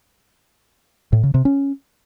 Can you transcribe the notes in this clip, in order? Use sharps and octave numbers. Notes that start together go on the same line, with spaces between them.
A2
C#3
C3
C#4